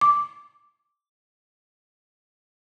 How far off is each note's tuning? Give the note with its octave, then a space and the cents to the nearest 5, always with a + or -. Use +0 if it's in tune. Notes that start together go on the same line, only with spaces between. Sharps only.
D6 -5